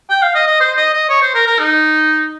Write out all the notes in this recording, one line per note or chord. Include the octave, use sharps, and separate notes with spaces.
G5
F5
D#5
D#5
C5
D#5
D#5
C#5
C5
A#4
A#4
D#4